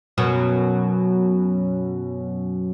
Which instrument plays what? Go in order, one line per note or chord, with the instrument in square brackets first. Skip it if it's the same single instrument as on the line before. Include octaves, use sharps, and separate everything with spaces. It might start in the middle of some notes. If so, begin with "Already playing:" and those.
[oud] F#2 B2 F#3